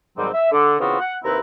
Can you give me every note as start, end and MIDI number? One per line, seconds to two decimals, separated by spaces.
0.18 0.29 44
0.18 0.29 51
0.18 0.29 54
0.18 0.29 55
0.18 0.29 60
0.34 0.50 76
0.52 0.75 50
0.80 0.98 49
0.80 0.98 52
0.80 0.98 59
0.80 0.98 60
0.80 0.98 65
0.80 0.98 66
1.00 1.16 78
1.24 1.39 39
1.24 1.39 48
1.24 1.39 60
1.24 1.39 64
1.24 1.39 71
1.24 1.39 82